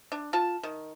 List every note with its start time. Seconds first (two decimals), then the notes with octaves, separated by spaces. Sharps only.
0.12 D4
0.33 F4 A5
0.63 D#3